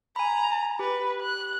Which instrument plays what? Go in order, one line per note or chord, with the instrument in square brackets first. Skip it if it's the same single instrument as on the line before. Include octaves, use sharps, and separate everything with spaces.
[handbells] G#5 B5 [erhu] A#5
[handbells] G4 [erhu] B4
[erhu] F#6